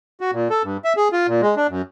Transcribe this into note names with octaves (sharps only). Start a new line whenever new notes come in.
F#4
A#2
A4
G2
E5
G#4
F4
A#2
G#3
D4
F#2